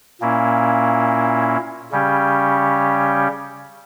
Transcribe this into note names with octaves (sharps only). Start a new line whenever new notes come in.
A#2 A#3 C#4 E4
C#3 G3 C#4 G4